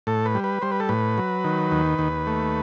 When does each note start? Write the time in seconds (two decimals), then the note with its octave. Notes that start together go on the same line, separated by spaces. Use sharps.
0.07 A2 A4
0.26 B4
0.35 G3
0.44 B4
0.62 G3 C5
0.71 B4
0.80 A4
0.89 A2 B4
1.18 F#3
1.44 D#3
1.71 D#2
1.99 D#2
2.27 A3